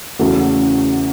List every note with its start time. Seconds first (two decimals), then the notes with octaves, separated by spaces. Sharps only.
0.19 E2 C#3 A3 F#4